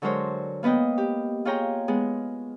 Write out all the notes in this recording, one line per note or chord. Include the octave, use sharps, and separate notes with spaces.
D3 F#3 G#3 A#4 C5 C#5
A#3 B3 B4 D#5 G5
G4
F4 G#4 C#5 G5 A#5
G#3 B3 G#4